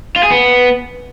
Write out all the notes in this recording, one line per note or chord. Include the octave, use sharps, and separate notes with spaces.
F4
G#4
B3